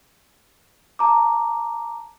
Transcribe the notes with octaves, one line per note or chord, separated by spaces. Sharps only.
A5 A#5 D6